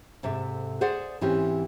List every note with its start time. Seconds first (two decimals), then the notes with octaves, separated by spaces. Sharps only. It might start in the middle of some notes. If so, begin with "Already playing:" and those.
0.23 G#2 C3 A4 E5
0.81 G#4 C5 D5 F#5
1.21 G#2 E3 C4 C#4 G4